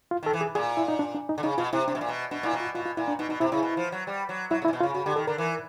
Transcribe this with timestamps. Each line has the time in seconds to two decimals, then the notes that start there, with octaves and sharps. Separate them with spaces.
0.11 F4
0.23 D#3
0.26 A4
0.33 E3
0.41 G#4
0.55 A#2 G#4
0.77 E4
0.88 D#4
0.99 D4
1.15 D4
1.29 D#4
1.38 D3
1.43 C#3 D#4
1.58 B2 F4
1.73 C3 E4
1.88 C3 D4
1.95 B2
2.01 A#2
2.09 B2
2.31 B2 D4
2.43 A#2 E4
2.53 B2
2.60 F4
2.75 B2 F4
2.86 F4
2.97 A#2 E4
3.08 D4
3.19 B2 D#4
3.29 B2 D#4
3.40 C3 E4
3.52 C#3 E4
3.63 B2
3.77 F3
3.92 F#3
4.07 G3
4.29 F#3
4.51 F#3 E4
4.62 C#3
4.65 E4
4.68 A#2
4.73 B2
4.80 F4
4.83 C#3
4.94 C#3 F#4
5.06 D3 G4
5.16 D#3 A4
5.27 D3 A#4
5.38 E3